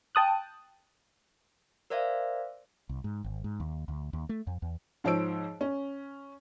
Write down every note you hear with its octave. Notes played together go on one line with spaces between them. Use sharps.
G5 A5 D#6 F#6
A#4 C5 D5 E5 F5
C2
G#2
G#1
G#2
D#2
D2
D#2
A3
F2
E2
G#2 F3 C5 C#5 E6 D7
C#4